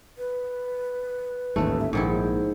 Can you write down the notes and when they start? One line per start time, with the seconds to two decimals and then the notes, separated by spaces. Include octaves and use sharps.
0.18 B4
1.56 A1 D#2 G#2 A3
1.80 E5
1.93 A#1 G#2 D#3 E4 C5